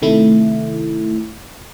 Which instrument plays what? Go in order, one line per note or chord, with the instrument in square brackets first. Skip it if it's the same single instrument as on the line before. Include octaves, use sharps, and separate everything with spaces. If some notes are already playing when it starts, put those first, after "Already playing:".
[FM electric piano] C3 D#3 A3 E4